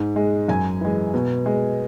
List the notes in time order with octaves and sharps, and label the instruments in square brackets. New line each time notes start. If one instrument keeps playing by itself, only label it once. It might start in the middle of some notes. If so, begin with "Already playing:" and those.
Already playing: [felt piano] G#2
G#3
F#2 G#5
E3 G#3
B2
G#3